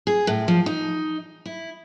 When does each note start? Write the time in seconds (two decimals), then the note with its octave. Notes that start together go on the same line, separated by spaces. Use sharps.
0.07 G#4
0.27 A2
0.48 F3
0.66 D#4
1.46 E4